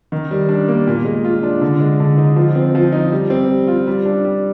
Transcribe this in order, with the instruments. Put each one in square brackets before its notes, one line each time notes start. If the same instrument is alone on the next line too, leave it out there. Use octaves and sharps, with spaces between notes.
[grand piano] D#3
G3
D4
A#3
A#2
G#3
F4
D4
D3
G#3
D3
D#4
F3
C4
F3
D#4
G3
C4
G3
F4
G3
D4
G3